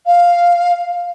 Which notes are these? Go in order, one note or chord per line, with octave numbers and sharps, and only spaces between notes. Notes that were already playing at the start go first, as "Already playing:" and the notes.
F5